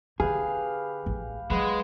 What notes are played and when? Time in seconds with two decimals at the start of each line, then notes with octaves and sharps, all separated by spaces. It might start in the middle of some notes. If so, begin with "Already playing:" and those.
0.20 D3 G4 G#4 B4 F5
1.06 A1
1.50 F#3 G#3 B3